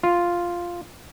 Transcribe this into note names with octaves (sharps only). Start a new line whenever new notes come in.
F4